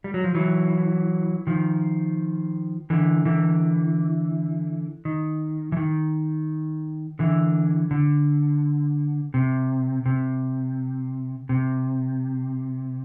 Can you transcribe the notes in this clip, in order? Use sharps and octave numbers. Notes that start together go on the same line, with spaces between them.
G3
F#3
F3
E3 F#3
D#3 F3
D3 E3
D3 E3
D#3
E3
D#3
D3 E3
D3
C3
C3
C3